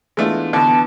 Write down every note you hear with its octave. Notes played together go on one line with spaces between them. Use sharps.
E3 G#3 A3 B3 D4 F4
B2 D3 A5